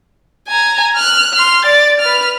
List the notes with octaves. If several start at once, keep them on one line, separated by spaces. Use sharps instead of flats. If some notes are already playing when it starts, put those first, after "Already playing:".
G#5 A#5
F6 F#6
C6 F6
D5 A6
B4 F6